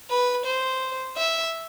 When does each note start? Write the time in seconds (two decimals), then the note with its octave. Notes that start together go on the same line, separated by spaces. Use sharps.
0.10 B4
0.46 C5
1.17 E5